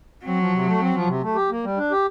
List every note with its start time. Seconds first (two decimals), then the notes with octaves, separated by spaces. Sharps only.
0.24 F#3 C4
0.39 F3
0.53 C3
0.66 A3
0.80 C4
0.94 F3
1.07 C3
1.22 A3
1.35 G4
1.50 A#3
1.64 G3
1.77 D4
1.91 G4